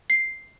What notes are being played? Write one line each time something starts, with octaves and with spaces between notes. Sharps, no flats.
C7